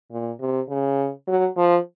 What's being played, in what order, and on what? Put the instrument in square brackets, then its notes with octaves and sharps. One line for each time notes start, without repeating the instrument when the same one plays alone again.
[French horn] A#2
C3
C#3
F#3
F3